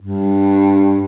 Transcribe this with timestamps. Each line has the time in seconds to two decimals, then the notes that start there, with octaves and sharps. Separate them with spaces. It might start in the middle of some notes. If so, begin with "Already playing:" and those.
0.01 G2